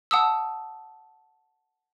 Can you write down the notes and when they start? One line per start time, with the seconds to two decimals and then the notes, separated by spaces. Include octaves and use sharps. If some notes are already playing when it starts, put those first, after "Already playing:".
0.11 F#5 A5 D#6 E6